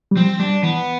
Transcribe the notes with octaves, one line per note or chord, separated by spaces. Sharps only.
G3
F3 C4
G3 D4
E3 B3